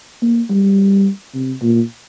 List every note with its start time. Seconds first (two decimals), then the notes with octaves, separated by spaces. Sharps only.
0.22 A#3
0.50 G3
1.34 C3
1.61 A#2